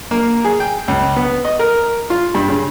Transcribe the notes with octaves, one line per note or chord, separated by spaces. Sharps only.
A#3
G#4
G5
C#2
B3
D#5
A#4
F4
G2
C#3